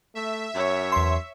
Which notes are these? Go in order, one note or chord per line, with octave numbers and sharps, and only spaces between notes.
A3 E5
F#2 C#5
E2 C6